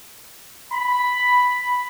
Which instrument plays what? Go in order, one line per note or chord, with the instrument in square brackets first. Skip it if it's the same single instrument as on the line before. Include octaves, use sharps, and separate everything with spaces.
[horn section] B5